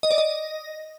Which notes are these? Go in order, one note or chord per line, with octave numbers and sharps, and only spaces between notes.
D#5
D5
D#5